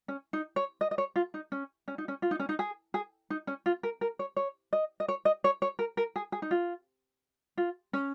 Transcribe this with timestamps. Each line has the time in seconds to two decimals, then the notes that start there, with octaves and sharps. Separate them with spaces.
0.08 C#4
0.33 D#4
0.56 C#5
0.81 D#5
0.91 D#5
0.98 C#5
1.16 F4
1.34 D#4
1.52 C#4
1.88 C#4
1.98 D#4
2.08 C#4
2.22 F4
2.31 D#4
2.40 C#4
2.49 D#4
2.59 G#4
2.94 G#4
3.30 D#4
3.47 C#4
3.66 F4
3.83 A#4
4.01 A#4
4.19 C#5
4.36 C#5
4.73 D#5
5.00 D#5
5.08 C#5
5.25 D#5
5.44 C#5
5.62 C#5
5.79 A#4
5.97 A#4
6.16 G#4
6.32 G#4
6.42 D#4
6.51 F4
7.58 F4
7.93 C#4